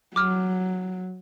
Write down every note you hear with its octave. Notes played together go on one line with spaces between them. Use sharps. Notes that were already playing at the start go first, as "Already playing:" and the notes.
F#3 D6 F6